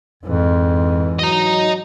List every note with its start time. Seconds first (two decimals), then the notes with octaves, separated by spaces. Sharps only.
0.23 F2 G#2 E3
1.19 F#3 D#5 A#5